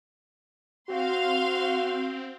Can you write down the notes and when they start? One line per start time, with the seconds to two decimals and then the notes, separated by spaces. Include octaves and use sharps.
0.90 C4 F#4 F5 C6